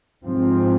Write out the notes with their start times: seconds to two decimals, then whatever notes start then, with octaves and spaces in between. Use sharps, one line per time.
0.24 G#2 F3 C4